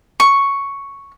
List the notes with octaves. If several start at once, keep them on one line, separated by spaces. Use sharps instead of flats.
C#6